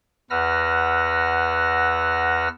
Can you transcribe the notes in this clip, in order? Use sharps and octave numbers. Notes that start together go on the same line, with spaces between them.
E2 B4 F#5 E6 F6 A#6